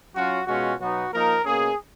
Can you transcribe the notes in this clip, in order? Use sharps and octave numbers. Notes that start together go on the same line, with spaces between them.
F#3 C#4 F4 F#4
B2 G#3 C#4 F4 F#4
B2 F#3 B3 D#4 F#4
F3 A#3 D#4 A#4
B2 A#3 C#4 G#4